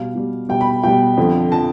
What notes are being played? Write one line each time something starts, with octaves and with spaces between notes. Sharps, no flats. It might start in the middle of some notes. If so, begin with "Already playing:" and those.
Already playing: B2 G3 F5
B2 G3
B2 G3 G5
B5
B2 G3 G5
F2 D3 F3
D3 F3 A5